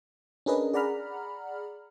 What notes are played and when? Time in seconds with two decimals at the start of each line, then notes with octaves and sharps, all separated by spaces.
0.46 C#4 D4 G#4 A#4 B4 D#5
0.73 G#4 D5 F#5 A#5 B5 F6